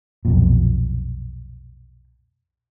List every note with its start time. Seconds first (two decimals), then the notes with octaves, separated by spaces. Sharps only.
0.25 B1 F2 A#2